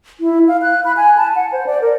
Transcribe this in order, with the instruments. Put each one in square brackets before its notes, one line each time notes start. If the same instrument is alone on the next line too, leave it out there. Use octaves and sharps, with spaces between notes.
[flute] E4
F5
F#6
B5
G#5
A5
F#5
C5
D5
A#4